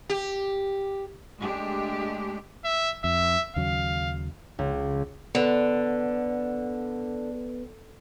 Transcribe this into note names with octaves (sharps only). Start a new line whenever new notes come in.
G4
G#3 A3 D4 G4
E5
F2 E5
D#2 C#3 F#3 F5
C#2
D3 B3 B4